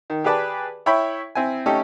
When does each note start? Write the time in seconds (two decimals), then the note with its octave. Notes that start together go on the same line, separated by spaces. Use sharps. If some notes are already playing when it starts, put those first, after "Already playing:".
0.10 D#3
0.24 G4 G#4 B4 D5 A5
0.86 E4 C#5 E5 G5 B5
1.35 C4 E4 G#5
1.66 A3 C#4 D#4 G4 A4